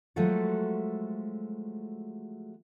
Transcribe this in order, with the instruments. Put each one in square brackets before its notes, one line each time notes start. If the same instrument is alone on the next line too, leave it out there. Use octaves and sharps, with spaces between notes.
[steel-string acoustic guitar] F3 F#3 G#3 A3 F#4 A4